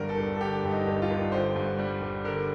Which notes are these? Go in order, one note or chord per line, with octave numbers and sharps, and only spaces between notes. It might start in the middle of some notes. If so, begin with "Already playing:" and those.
Already playing: G1 G2 D3 A#4
A4
G1
A4
D3 G4
G2
D#4
G1
F4
G1
D3 C5
G2
G3
G1
D3 A#4